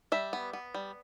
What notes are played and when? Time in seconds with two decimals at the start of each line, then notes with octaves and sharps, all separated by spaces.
0.12 G3 E5
0.33 B3
0.53 B3
0.74 G3